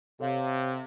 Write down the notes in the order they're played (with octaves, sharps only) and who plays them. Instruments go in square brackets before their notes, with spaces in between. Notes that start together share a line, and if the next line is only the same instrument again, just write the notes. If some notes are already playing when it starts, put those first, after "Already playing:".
[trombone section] C3 [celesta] A4 C#5 F5